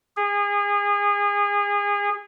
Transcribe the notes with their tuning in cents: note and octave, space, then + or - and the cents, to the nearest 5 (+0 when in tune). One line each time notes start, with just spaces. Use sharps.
G#4 -30